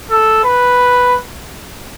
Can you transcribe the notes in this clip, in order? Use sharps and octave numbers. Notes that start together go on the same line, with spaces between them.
A4
B4